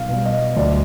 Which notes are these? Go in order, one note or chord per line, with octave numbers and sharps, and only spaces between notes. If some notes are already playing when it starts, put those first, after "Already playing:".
Already playing: B1 F5
B2 G3
D#5
D2 D5